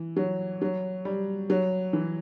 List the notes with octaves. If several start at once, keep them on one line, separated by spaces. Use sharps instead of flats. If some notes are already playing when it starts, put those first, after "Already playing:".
Already playing: E3
F#3
F#3
G3
F#3
E3